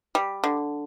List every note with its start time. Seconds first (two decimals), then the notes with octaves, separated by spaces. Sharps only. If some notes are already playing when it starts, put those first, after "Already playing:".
0.15 G3
0.44 D3